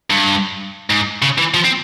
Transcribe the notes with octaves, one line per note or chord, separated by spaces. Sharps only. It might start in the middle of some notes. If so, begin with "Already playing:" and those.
G2
G#2
C#3
E3
F3
C4